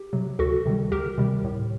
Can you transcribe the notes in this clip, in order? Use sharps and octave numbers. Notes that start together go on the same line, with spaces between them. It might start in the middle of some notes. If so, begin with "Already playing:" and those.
Already playing: G4
C3 F#3
D2 F#4 A4
C3 D#3 G3
D2 G4 A#4
C3 D#3 G3
A2